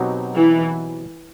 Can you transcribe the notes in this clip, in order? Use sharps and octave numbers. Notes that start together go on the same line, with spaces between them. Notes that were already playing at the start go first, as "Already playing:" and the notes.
Already playing: B2 F#3 C4 D#4 G4
E3